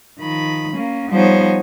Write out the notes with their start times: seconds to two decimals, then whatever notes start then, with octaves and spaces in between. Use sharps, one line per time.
0.21 D#3 F3 B5
0.73 A#3 C#4
1.10 F3 G3 B3 D#4 C5 C#5